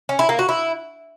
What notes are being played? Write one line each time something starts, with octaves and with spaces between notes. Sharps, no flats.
C#4
E4
A#3
F#4
E4